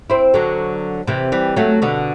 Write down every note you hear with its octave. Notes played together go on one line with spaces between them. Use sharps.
C4 E4
D3 F#3
C3 E3
E3 G3
F#3 A3
B2 D3